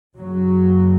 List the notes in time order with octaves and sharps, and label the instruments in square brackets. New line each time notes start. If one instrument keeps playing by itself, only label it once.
[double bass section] F#1 F#2 C#3 F#3